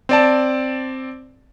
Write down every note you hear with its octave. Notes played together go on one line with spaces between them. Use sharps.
C4 D5 A5